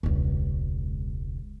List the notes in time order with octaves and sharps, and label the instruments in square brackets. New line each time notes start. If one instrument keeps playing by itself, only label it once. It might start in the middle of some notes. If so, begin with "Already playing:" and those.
[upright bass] E1 C#2